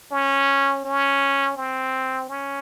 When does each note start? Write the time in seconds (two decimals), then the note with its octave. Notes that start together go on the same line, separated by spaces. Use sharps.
0.12 C#4
0.85 C#4
1.57 C4
2.29 C#4